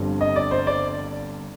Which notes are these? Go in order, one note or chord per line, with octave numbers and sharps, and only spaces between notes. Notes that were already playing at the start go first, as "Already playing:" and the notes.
Already playing: G1 G2 F3 C4
D#5
D5
C5
D5